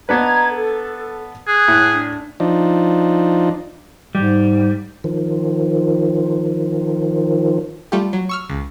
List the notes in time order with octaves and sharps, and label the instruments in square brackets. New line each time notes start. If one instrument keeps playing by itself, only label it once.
[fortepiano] B3 D4 B4 [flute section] D#5 A#5 G#6
[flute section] A4
[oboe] G#4 [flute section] F#6
[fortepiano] A2
[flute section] D4
[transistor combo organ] F3 D4 D#4
[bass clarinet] G#2 [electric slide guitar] G3
[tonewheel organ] D#3 F3
[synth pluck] G3 A3 F4 G4
F#3
C#6 E6 F6
C#2